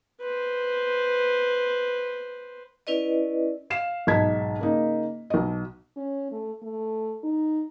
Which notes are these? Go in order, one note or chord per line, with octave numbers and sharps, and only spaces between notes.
B4 C5
C#4 E4 B4 D5 D#5
F5 C7 E7
B1 G#2 D#4 A5 G#6 B6
C#3 A#3 D#4
B1 D#5
C#4
A3
A3
D#4